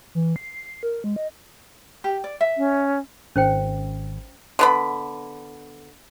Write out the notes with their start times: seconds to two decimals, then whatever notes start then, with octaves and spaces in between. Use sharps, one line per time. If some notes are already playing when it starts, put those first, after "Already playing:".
0.15 E3
0.36 C7
0.83 A#4
1.04 G#3
1.16 D#5
2.04 G4
2.24 D5
2.41 E5
2.57 C#4
3.36 G#1 C#4 C5 G5
4.59 D3 B3 B5